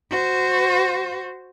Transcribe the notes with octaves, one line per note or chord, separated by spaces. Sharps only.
F#4 C5